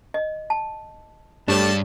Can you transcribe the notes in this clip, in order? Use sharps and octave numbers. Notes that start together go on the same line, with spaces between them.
D#5
A5
G2 A3 D4 G4 G#4 C#5 A5